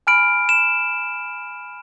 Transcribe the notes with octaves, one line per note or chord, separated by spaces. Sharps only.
G#5 B5 F6 D7
E7